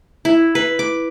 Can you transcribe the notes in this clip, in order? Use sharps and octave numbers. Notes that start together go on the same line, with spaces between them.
E4
B4
D6